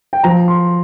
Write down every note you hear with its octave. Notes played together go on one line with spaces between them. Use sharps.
G5
F3 A#5
C6